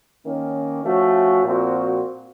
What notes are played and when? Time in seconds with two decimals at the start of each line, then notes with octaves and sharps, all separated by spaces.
0.25 D#3 A#3 C#4
0.84 F3 A3 C#4 F#4
1.44 A#2 F3 C4 F#4